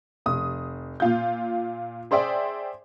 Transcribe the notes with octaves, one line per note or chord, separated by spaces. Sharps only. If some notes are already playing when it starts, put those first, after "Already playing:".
F1 D#6
A#2 F4 G6
G#4 C5 D5 E5 G5